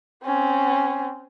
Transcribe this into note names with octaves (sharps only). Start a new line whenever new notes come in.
C4 C#4